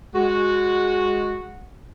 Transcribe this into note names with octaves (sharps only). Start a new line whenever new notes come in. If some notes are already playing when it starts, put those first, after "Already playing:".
G#3 F#4